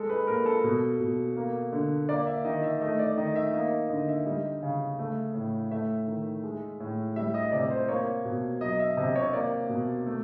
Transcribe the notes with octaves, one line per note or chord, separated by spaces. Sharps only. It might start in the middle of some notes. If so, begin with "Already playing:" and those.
Already playing: G#3 A4
B4
A#2 A#4
A4
B2
B2
A#3
D3
A#3 D5
E5
D#3 D#5
E5
A3 D#5
D5
D#3 D#5
E5
A#3 D#5
D3 D#5
E5
G3 D#5
C#3
A3
A2
A3 E5
D#3
G#3
A2
G3 E5
D#5
C3 D5
C5
A#3 C#5
B2
F#3 D#5
E5
C3 D#5
C#5
A#3 D5
B2
A3